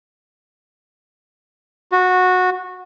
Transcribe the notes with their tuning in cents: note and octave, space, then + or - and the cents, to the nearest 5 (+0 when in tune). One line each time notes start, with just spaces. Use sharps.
F#4 -15